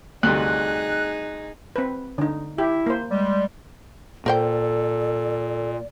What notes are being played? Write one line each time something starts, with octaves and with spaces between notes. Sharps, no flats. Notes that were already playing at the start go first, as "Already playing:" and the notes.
D2 G2 C3 D#4 G#4 F#6
C4 B4
D3 D#4
E4 G4 E5
A#3 C5
G3 G#3
A#2 A4 A#4 C5 D5 G5